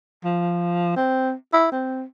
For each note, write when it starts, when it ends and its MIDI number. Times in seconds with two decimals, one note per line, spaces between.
0.24 0.92 53
0.96 1.33 60
1.53 1.67 64
1.72 2.04 60